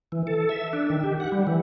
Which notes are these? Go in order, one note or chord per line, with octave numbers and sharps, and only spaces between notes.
E3
A4
E5
D4
D#3
G4
F#5
G3
E3